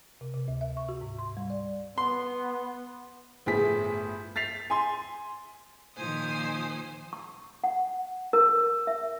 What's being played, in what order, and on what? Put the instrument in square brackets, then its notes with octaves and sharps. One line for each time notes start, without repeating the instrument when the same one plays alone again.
[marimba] C3
C3
D2
E5
C#6
F#4
G#2
C6
G3
D5
[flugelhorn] B3 [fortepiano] C6
[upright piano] G1 A2 F3 G#4 B6
A6 B6 C7 F7
G#5 C6
[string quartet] A#2 D#3 F3 C5 G#5 D#6
[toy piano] C#6
F#5
A#4
E5